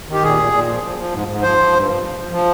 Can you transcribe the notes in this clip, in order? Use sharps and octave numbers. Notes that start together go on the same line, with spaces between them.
D#3 G4
A#2 G#4
A#2
A#2
F3
F3
F3
G#2
G#2
F3 C5
F3
G2
F3
F3
F3
F3